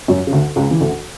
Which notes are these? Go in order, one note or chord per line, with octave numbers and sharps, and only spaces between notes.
F#2 F#3
C#3
D2 D3
C#2 C#3
E3
D2 D3